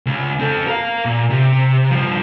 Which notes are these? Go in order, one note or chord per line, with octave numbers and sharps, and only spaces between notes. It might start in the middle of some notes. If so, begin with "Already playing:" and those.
C#2
C4 A4
A#4 F5
A#2
C3
G2 F3